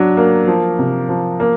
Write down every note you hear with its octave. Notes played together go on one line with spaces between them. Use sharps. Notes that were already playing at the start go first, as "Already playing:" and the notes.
Already playing: F#3 D4
A#3
F3
C3
F3
A#3